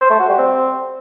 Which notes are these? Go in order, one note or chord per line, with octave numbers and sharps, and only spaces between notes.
C5
A3
F#4
G3
C4